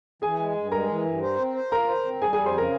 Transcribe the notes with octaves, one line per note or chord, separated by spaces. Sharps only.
E3 G#4 G#5
G#3
G2
G#3 A#4 A#5
E3
G2
C5
C4
C5
F4 A#4 A#5
C5
C4
G3 G#4 G#5
G#4 G#5
F2
C5 C6
C#3 A#4 A#5